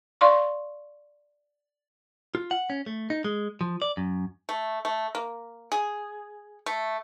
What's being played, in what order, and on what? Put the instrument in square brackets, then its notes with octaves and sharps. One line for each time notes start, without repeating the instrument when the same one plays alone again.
[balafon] D5 F5 C6 C#6
[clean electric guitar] F4
F#5
C#4
A3
D#4
G#3
F3
D5
F#2
[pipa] A3
A3
A#3
G#4
A3